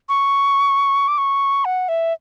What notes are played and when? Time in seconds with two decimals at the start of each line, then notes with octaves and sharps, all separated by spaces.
0.09 C#6
1.08 D6
1.18 C#6
1.65 F#5
1.89 E5